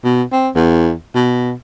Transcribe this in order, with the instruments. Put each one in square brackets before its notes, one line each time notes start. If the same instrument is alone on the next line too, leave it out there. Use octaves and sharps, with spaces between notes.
[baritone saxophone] B2
C4
E2
B2